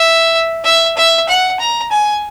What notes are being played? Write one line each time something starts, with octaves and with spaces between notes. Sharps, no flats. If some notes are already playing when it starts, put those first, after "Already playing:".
Already playing: E5
E5
E5
F#5
A#5
G#5